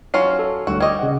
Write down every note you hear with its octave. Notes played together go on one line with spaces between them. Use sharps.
F#3 C#4 F4 C7
A4
D2 D3 G3 F#4
G3 D#5 C#6 D6 G#6
C#3 F#5